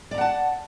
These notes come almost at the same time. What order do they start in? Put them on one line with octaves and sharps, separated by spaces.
D5 A#5 F#5 A5